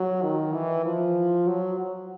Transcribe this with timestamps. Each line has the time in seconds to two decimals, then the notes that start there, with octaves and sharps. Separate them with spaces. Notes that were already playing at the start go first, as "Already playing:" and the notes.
Already playing: F#3
0.22 D#3
0.53 E3
0.85 F3
1.47 F#3
1.79 F#3